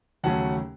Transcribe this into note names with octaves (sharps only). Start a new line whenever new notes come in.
D#2 C#3 F#3 A3 C#4 F#5 A5